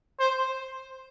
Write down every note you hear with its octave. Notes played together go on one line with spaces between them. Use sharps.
C5